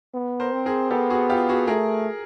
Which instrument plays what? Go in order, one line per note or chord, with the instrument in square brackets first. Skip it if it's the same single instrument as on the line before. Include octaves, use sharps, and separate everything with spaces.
[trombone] B3
[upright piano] A#4 C5
[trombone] C4
[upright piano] G#4 A#4
[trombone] B3 [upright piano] G4 A4
[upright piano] F#4 G#4
F4 G4
F#4 G#4
[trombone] A3 [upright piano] G#4 A#4